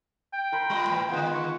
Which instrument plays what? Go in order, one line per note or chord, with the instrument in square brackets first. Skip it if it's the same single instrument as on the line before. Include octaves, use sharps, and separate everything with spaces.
[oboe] G5
[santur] A#4 C5 B5
[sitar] G3 F4 D#5
A2 E3
[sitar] D3 D#3 G#3 [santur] B3 F4 D#5
[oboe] C#6